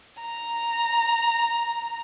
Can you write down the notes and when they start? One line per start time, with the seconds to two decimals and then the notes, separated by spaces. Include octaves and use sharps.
0.21 A#5